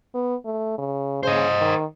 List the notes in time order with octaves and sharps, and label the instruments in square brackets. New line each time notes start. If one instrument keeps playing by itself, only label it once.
[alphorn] B3
A3
C#3
[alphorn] C#3 [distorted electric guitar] C5 D#5
[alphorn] D#3